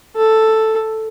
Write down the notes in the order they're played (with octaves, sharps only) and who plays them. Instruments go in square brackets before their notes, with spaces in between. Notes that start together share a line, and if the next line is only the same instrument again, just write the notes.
[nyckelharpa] A4